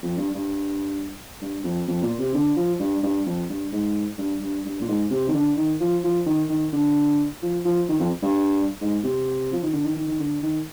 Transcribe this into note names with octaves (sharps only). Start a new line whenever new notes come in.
F2
G2
G2
G2
F2
F2
A#2
C3
D3
F3
G2
G2
F2
G2
G#2
G2
G2
G2
A#2
G#2
C3
D#3
D3
D#3
F3
F3
D#3
D#3
D3
F3
F3
D#3
F2
G2
G#2
C3
F3
D#3
D3
D#3
D#3
D#3
D3
D#3